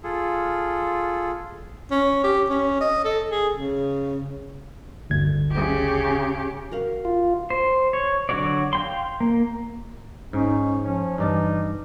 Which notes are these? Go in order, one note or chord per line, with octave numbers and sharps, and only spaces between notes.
F4 G#4 A4
C#4
G4
C#4
D#5
A4
G#4
C#3
G1 D2 G#6
C#3 G4
F#4 A#4 F5
F4
C5
C#5
D3 F#3 F#4 C#5 D5
F5 G5 C6
A#3
G#2 C#4 D#4
F3 C#4
G2 E3 D#4 D5 A5